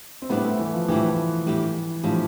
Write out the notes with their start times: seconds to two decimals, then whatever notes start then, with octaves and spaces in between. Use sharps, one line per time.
0.22 C4
0.29 A2 G3 B3 D4 G4
0.44 A3
0.59 E3
0.74 F3
0.88 A2 E3 G3 D4 G4
1.46 A2 G3 D4 G4
2.03 A2 F3 G3 D4 G4